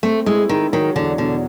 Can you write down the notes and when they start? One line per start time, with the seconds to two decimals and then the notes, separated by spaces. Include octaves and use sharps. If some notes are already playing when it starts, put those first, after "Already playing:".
0.03 A3 C4
0.26 G#3 E4
0.49 D#3 G#3
0.73 D#3 F#3
0.95 E2 D3
1.18 B2 D3